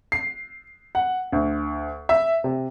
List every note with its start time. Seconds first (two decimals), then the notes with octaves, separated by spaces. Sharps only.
0.12 C7
0.95 F#5
1.32 D2
2.09 E5
2.44 C3